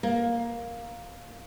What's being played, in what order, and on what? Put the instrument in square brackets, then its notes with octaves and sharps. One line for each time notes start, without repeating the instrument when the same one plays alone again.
[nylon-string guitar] A#3